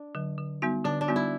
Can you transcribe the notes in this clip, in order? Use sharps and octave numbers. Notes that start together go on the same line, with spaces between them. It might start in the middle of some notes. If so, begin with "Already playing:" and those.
Already playing: D4
D3 F#3
D3
G3 B3 D#4 F#4
D3 D4
D4
G3 B3 D#4 F#4
E4